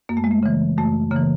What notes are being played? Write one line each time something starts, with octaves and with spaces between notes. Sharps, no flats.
F#2 A#3
A3
G#3
A3
C#3 E3
F#2 A3
C#3 E3 A#3